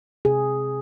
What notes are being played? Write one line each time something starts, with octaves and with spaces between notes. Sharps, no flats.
C3 G#4